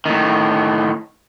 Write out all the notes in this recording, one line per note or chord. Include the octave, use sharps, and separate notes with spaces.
A2 D#3